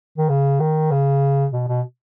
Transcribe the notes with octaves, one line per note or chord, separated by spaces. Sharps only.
D#3
C#3
D#3
C#3
B2
B2